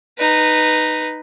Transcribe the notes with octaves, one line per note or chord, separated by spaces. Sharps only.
D#4 B4